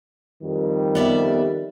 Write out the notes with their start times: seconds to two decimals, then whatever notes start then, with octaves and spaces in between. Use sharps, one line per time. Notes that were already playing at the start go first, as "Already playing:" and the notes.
0.43 F2 D#3 G3
0.95 B3 D5 E5